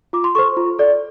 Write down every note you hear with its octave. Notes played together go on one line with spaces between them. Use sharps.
F4 D6
C6
A4 C5 C#6
F4
A4 D5